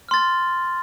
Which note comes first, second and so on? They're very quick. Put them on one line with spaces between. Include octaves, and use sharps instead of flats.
F6 C6 A6